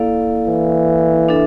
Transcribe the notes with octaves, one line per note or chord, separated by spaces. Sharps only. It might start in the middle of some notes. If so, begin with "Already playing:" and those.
Already playing: A#3 E4 A4 D5 F5
E3
D4 A4 E5